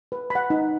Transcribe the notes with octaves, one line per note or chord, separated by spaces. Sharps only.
B4
F#5 B5
D#4